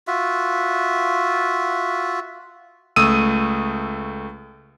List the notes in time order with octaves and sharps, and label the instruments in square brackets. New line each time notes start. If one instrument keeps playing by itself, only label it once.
[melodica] F4 F#4 E5
[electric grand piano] C#2 A3 D#6 E6 D#7